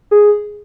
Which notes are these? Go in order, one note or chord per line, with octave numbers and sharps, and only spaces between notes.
G#4